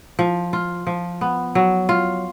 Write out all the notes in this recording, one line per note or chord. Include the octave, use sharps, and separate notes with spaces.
F3
F4
F3
B3
F#3
F4